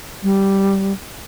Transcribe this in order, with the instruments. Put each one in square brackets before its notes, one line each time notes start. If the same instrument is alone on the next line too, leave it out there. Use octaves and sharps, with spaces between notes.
[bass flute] G3